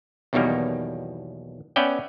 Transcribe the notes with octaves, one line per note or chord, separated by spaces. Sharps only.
B1 E2 B2 D#3 G3 A#3
B3 C#4 B4 D5 E5 G5